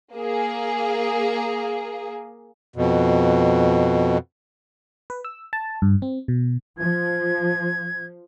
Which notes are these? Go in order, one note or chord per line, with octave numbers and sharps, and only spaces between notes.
A#3 G#4
F2 B2
B4
E6
A5
G2
C4
B2
F3 G#6